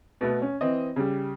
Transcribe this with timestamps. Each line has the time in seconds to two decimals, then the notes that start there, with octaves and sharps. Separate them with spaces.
0.21 B2 A3 B3
0.42 C#4
0.61 E3 C4 D#5
0.96 C#3 G3